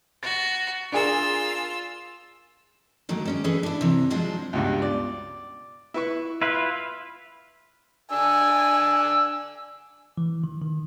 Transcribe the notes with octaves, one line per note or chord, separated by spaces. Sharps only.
F#4 A6
D4 F4 G#4 A#4 E6
D3 D#3 F#3 A3 A#3
G#3 C#4 D5
E3 C#4 G#4 A4 B4
D4 E4
C3 E3
F3 F#3 G#3 D4 F4 C5
C#2 G2 B2
D5
E4 B4 C#6
E4 F4 B4 E5
D4 G#5 E6
E3
D#3
D#3